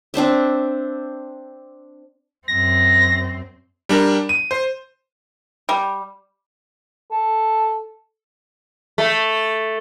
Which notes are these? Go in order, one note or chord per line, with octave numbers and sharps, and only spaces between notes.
C4 D4 C5 E5
F#2 C4 A#6
G3 D4 A#4
D#7
C5
G3
A4
A3